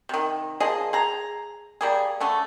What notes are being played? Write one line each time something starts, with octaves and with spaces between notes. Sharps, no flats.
C3 D#3
F3 A#3 G#4 D#5
G#4 A#5
G3 A#3 G#4
D3 A3 C#4